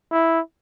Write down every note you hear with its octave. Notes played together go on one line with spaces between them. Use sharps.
E4